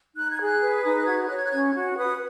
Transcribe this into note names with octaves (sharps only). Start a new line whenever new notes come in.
D#4 F#6
G#6
G#4 F#6
B4
D#4 D#6
F#6
F#4 G#6
C#5 F#6
G#6
F#6
C#4 G#6
F#4
B4 D#6